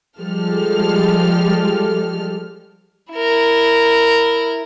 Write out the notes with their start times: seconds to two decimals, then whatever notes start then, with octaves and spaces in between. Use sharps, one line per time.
0.20 F3 G3 G#3 G4 A4 F6
3.13 E4 A#4